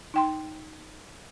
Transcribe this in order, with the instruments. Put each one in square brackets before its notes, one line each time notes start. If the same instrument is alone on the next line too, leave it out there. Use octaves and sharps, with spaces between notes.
[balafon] D#4 G5 C6